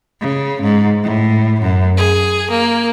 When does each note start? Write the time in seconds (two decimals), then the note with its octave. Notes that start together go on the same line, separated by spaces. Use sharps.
0.20 C#3
0.61 G#2
1.03 A2
1.62 F#2
1.97 G#4
2.50 A#3